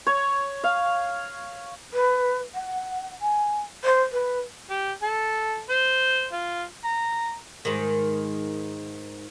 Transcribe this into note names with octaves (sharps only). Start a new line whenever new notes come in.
C#5
F5
B4
F#5
G#5
C5
B4
G4
A4
C5
F4
A#5
G#2 D#3